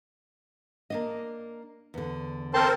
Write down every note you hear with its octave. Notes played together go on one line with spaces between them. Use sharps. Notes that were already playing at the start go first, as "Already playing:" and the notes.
A#3 D4 D#5
E2 D3
C4 A4 A#4 C5 A5 C6